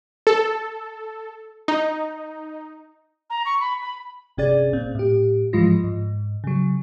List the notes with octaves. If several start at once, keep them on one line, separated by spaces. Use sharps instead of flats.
A4
D#4
A#5
C#6
B5
B5
G1 C3 C#4 G#4 D5 A6
A#2 C4
A2 G4
G#2 E3 F3 G#3 F4 A#6
G#2
C#3 F#3